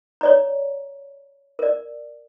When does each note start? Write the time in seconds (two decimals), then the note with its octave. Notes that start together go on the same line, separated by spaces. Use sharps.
0.21 C#5 D5 A#5
1.59 A#4 D5